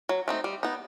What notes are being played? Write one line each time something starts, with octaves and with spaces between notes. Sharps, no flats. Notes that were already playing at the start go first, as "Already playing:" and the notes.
F#3
A3 C4 D#4
G3
B3 D#4